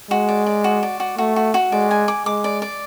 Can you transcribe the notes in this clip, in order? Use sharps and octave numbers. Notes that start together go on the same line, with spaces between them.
G#3 F#4
D5
D5
F#4
D5
F#4
A3 F#4
F#4
F#4
G#3 D5
G#5
D6
G#3 D6
D5
D5